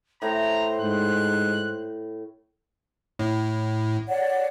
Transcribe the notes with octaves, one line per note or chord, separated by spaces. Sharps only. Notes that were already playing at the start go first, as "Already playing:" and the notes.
A2 C5 A#5
G#2 F#6
A2
C#5 D5 F#5